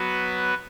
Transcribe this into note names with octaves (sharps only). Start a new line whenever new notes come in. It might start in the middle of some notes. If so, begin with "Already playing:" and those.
Already playing: F#3 B3 F#4 B4